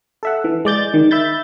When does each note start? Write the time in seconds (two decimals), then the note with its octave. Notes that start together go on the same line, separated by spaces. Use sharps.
0.23 A4 E5 F#5
0.44 E3
0.65 G#3 D5 G6 A6
0.94 D#3
1.11 E5 B5 G6 A6